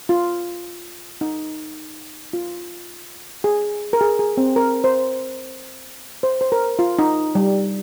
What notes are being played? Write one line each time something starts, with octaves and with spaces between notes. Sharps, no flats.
F4
D#4
F4
G#4
A#4
G#4
G#4
C4
A#4
C5
C5
C5
A#4
F4
D#4
G3